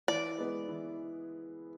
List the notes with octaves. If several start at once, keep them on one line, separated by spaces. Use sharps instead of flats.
E3 D5
G#3 B3
E3